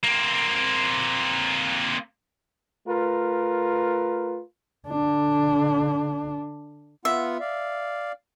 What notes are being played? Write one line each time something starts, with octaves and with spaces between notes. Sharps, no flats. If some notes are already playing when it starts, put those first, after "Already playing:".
A#3 C4
A3 F4 A#4 B4
D3 D4
B3 F4 E5 F#5
D5 F5